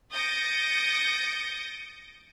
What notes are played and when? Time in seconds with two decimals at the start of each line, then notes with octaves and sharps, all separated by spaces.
0.13 D#6 G6 A6 A#6 C#7 D7